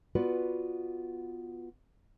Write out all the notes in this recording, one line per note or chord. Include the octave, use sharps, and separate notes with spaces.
B3 F4 F#4 B4 D5